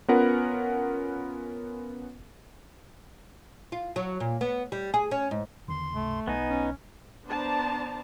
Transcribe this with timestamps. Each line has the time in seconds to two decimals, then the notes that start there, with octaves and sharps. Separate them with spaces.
0.08 B3 C#4 F4 A#4 B4 F#5
3.72 F4
3.96 F#3
4.20 A#2
4.41 B3
4.72 G3
4.94 G#4
5.11 C#4
5.31 G#2
5.68 E2 D3 D#3 C6
5.94 C#2 G2 C3 A3
6.27 B1 B3 D#4 G#5
6.50 C#4
7.27 B3 D4 C5 D5 A5 A#5